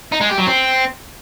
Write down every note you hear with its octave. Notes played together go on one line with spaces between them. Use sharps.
D#4
G#3
G4
F#3
C4